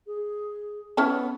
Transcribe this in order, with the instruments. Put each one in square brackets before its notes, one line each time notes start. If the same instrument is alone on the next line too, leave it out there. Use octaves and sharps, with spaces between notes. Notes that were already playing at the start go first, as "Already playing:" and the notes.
[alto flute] G#4
[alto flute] B3 [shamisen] C#4 E4 A4